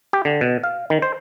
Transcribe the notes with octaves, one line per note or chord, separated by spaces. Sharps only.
G4
D3
B2
F5
D#3
C5